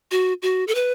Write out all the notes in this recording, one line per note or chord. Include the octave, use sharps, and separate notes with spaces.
F#4
F#4
A4
B4